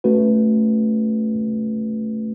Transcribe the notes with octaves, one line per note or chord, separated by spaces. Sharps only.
A3 C#4 F#4 B4